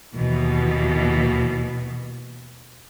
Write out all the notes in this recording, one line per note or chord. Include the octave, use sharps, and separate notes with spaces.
D#2 B2 E3